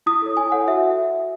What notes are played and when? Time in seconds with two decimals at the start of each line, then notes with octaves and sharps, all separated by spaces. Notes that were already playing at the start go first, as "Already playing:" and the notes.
0.06 E4 D#6
0.22 A4 C#5
0.37 E4 G#5
0.52 A4 C#5 F#5
0.68 F#4 E5